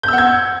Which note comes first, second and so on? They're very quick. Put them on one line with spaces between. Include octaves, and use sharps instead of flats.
G6 E6 F#5 G#6